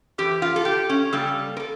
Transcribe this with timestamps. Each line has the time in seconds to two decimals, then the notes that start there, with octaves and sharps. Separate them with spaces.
0.18 F2 E3 G4
0.42 F4
0.56 A4
0.65 G4
0.89 C#4
1.12 C#3 G3 A#3 A4
1.57 A#4
1.60 A4